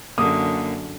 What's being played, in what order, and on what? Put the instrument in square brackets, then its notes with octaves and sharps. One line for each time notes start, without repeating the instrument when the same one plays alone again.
[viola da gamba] F#2 D3 [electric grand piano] A#3 [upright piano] D#6